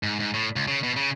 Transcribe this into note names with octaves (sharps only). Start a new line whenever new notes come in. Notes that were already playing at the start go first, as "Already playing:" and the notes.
G#2
G#2
A2
C#2
C#3
B2
C#3